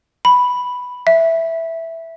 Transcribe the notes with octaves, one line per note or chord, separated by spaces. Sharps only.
B5
E5